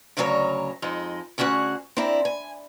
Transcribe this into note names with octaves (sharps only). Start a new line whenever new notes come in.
D2 G2 C#3 F#3 A#4 C#5
F2 G#3 D#4
D2 C#4 F#4 G#4 F#5
C4 D4 E4 A#4
G#5